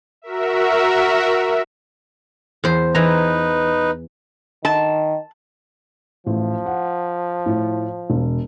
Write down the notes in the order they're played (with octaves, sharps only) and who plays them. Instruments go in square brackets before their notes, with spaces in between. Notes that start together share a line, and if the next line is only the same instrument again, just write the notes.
[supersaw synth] F#4 A#4 E5
[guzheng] E2 C5
[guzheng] E3 A#5 [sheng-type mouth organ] D#4 B4
[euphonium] D#3 [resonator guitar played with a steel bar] A5
[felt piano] A1 [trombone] F3
[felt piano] F#5
A2
E1